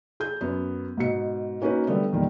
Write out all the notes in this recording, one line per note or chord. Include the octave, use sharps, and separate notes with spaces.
G#4 G6
F#2 B3
G#2 B2 C#7
A#3 C#4 D#4 F#4 B4
D3 G3 A3 B3
E2 A#2 D#3 G3